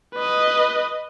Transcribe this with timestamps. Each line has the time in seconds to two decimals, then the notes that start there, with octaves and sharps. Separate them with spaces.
0.14 B4 D#5